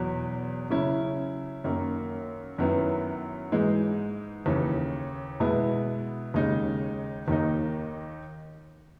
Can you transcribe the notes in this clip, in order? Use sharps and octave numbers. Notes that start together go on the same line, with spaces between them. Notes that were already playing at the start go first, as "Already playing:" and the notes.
Already playing: E2 B2 F#3
C#3 F#3 C#4 E4
F#2 D#3 A#3
F#2 D#3 F#3 B3 E4
G#2 E3 G#3 D#4
D#2 C#3 E3
B2 G#3 B3 E4
D#2 C#3 G#3 D#4
D#2 D#3 A#3 D#4